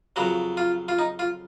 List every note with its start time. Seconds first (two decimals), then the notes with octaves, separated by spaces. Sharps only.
0.16 F2 C#3 F#3 F#4
0.57 F4
0.88 F4
0.98 D#4
1.19 F4